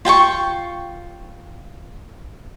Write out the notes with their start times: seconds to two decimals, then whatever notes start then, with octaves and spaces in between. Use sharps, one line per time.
0.05 F4 G5 G#5 C#6